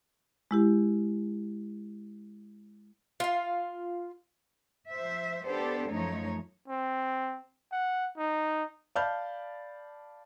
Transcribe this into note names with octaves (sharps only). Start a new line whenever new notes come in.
G#3 E4 G4
F4 F5
F3 C5 E5
B3 D4 G4 A4 C5
F#2 F3 A3 D#4 C#5
C4
F#5
D#4
D5 F5 A5 B5 F6 G6